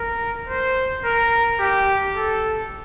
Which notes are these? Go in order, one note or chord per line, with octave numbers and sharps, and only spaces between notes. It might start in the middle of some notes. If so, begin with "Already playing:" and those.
Already playing: A#4
C5
A#4
G4
A4